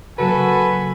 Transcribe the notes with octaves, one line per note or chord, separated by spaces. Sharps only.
C#3 F#3 A#3 F#4 A4 B4 G#5 B5